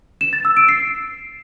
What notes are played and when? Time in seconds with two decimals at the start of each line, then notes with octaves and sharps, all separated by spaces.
0.21 E7
0.33 A6
0.45 E6
0.57 D7
0.69 C7